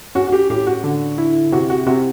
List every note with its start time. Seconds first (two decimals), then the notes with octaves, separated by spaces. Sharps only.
0.15 C#4 F#4
0.27 F#4
0.32 G4
0.50 A2 G4
0.67 F#4
0.84 D3
1.18 E4
1.52 C3 F#4
1.70 F#4
1.87 C3 F#4